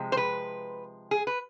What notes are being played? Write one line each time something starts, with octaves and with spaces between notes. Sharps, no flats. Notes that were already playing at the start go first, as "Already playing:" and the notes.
Already playing: C3 F3 G#3
C5
B4
G#4
B4